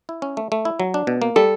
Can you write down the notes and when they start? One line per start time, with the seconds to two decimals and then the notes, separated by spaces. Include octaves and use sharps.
0.09 E4
0.22 C#4
0.37 A3
0.52 A3
0.65 E4
0.80 F#3
0.94 D4
1.07 B2
1.22 A#3
1.36 G3 A4